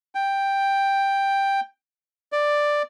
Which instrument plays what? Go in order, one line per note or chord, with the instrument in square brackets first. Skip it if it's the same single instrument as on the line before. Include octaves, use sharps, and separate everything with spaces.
[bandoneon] G5
D5